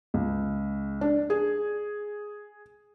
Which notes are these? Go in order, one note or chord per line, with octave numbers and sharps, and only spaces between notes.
C#2
D4
G#4